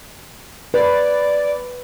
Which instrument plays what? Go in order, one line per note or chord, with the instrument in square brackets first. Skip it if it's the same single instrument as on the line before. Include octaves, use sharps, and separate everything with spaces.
[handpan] B4 [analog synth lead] D5